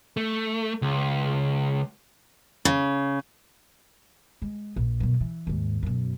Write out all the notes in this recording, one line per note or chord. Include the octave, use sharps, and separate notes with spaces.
A3
C#2
C#3
G#3
A#1
F#2 B2
E3
D#2 G#2
F#2 B2